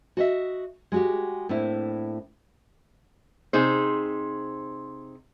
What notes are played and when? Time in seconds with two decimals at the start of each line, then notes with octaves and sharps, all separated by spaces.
0.17 F#4 D#5 E5
0.92 G#3 F#4 G4
1.49 A2 A#3 C4 D4 E4
3.53 C3 D#4 G#4 C5